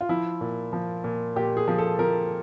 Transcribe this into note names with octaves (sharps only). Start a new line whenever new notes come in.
F4
F3 E4
A#2
F3
A#2
A#2 G4
G#4
F3
A4
F3 A#4